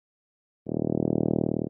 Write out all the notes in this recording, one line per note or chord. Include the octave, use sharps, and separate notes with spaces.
D#1